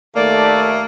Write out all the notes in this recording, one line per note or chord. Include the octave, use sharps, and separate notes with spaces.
D#2 A3 A#3 D5